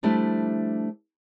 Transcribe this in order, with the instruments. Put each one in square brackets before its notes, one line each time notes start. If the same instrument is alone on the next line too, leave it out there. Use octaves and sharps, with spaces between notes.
[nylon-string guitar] F3 G3 A3 D4 E4